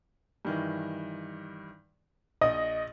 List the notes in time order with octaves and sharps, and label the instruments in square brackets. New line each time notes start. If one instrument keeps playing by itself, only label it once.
[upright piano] G2 D#3 E3
[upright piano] A#1 D#6 [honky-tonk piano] D#5